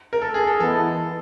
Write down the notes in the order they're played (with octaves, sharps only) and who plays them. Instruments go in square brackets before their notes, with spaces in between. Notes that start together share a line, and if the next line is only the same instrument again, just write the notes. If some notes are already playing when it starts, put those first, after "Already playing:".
[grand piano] A#4
A4
G#4
A4
[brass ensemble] E3 G#3 B3 E4 [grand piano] A4